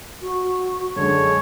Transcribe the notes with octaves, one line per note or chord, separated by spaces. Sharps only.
F#4
F#2 D3 G#3 A4 C#5